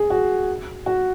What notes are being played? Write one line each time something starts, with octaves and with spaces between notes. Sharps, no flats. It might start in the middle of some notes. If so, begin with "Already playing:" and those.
Already playing: G#4
F#4
F#4